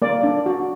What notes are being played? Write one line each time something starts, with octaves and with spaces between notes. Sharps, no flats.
A#3 D5
D4
F#4